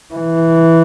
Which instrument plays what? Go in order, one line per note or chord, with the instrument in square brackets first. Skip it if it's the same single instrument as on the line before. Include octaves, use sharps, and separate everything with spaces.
[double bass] E3